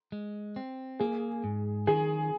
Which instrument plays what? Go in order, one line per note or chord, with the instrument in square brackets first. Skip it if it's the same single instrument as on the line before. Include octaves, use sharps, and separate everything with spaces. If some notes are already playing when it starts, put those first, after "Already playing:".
[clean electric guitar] G#3
C4
[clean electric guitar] A#3 [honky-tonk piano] G#4
[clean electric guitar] G#2
[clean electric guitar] D#3 [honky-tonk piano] G#4